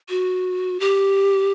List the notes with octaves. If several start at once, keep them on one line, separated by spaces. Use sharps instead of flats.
F#4
G4